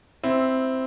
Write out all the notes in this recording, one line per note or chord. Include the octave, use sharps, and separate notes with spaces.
C4 E4